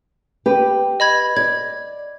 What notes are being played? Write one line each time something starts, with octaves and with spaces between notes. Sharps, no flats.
G4 B4
D#5 B5 G#6
D5 G#6